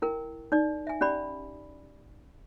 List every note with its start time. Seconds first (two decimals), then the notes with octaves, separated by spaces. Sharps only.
0.02 E4 A#4 G5
0.52 D#4 D5
0.87 E5 G#5
1.01 C#4 G4 D5 B5